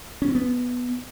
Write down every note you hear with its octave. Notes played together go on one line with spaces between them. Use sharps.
C#4
C4
B3